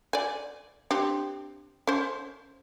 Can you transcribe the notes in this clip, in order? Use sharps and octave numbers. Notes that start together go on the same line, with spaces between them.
D5 G#5
C4 D4 G4
C#4 C5